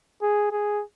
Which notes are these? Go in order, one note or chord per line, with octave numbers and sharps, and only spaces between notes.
G#4
G#4